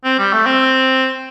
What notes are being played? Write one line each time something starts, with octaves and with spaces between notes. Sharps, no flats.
C4
G3
A3
C4